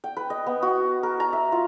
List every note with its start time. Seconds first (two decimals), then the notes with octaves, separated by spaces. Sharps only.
0.04 G5
0.17 B4
0.30 D#5
0.46 B3
0.62 F#4
1.03 A#4
1.20 A#5
1.33 E5
1.52 F4